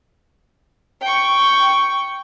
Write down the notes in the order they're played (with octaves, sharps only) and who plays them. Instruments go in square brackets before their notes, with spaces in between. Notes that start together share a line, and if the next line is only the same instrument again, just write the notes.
[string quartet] G5 C#6